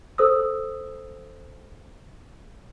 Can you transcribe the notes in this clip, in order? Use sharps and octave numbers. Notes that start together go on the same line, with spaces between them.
A4 C5 D#6 E6